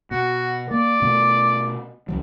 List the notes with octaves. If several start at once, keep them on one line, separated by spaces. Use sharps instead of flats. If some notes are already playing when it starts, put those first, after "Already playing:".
B2 F#4
A#3 D5
B2 A3 B3
C#2 F3 F#3